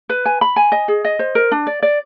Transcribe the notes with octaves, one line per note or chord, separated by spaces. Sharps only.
B4
G#5
B5
G#5
D#5
G#4
D#5
C5
A#4
D4
D5
D5